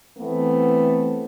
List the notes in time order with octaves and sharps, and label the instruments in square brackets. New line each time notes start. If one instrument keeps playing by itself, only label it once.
[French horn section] E3 A3 B3 C4